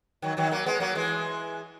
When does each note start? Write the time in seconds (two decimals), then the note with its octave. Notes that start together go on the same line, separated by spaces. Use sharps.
0.22 D#3 F#3
0.37 D#3 F#3
0.51 F#3 A#3
0.66 G#3 B3
0.80 F#3 A#3
0.95 E3 G#3